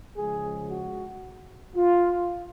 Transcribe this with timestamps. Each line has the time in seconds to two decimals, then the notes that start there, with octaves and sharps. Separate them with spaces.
0.18 C#3 F3 G#3 G#4
0.70 F#4
1.76 F4